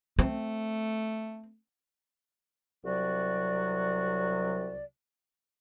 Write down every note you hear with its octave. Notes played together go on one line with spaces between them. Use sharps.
A3 C4
C2 C3 F#3 F#4 D5